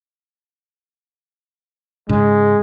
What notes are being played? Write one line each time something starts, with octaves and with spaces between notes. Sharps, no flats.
G#2 C#3 G#3